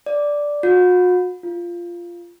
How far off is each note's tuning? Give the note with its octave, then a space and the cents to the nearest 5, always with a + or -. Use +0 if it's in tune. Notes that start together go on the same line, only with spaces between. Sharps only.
D5 -5
F#4 -40
F4 -10